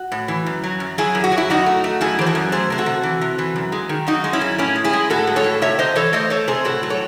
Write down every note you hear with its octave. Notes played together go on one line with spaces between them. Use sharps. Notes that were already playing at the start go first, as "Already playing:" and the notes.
Already playing: F#4
A2
E3
F#2
F#3
F#2
F#3 E4 G#4
F#2
F#4
F#3
E4
F#2 D#4 F#4
A3
A3
F#2 E4 G#4
E3 C5
F#4 A4
F#2
A3 G#4 C5
C3 C5
F#4 A4
C3
E3
C3
E3
F#2
G#3
D#3
F#2 D#4 F#4
G#3
C#4 E4
F#2
A2 C#4 E4
G#3
E4 G#4
G#3
A2 F#4 A4
G#3
A4 C#5
A2
C3 C#5 E5
C3 C5 D#5
E3 A4 C#5
A3 C5 D#5
A3 A4 C#5
C3 G#4 C5
A2 F#4 A4
F#3
A4 C#5